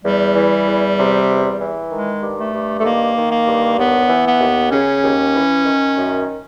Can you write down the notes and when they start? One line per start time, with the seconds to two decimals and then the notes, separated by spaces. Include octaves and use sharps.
0.05 E2 G3
0.35 E3
0.67 E2
0.98 C3
1.30 E2
1.61 E3
1.91 D#3 G#3
2.22 G2
2.38 A3
2.54 G2
2.79 A3
2.85 D#3 A#3
3.16 D#3
3.32 A#3
3.47 G2
3.78 D#2 B3
4.09 E3
4.25 B3
4.40 D#2
4.71 C#3 C#4
5.03 D#2
5.34 E3
5.65 D#3
5.96 F#2